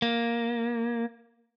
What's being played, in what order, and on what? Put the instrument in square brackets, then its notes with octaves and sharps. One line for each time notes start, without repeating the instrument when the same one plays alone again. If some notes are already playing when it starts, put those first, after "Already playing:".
[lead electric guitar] A#3